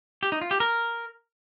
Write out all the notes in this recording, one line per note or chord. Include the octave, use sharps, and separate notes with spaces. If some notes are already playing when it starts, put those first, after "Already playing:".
G4
D#4
F4
G4
A#4